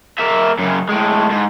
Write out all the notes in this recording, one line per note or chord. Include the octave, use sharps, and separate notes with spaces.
A#3 E5
F#2 C#3
A2 G#3
G#2